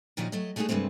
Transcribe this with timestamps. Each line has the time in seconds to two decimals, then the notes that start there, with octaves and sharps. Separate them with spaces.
0.17 A#2 D#3 F3 C#4 F#4 D#5
0.32 F#3 A3 D#5
0.56 G#3 A3 D4 D#4 F#4 G#4
0.69 G2 C3 G#3 A3 C4